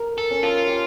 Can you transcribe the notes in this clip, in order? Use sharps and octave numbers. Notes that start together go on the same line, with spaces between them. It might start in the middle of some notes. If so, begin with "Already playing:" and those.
Already playing: A#4
A4
C#4
F4
G4